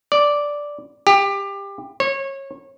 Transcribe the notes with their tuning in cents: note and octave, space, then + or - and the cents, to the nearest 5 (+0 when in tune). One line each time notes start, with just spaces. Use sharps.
D5 -5
G4 +20
C#5 -25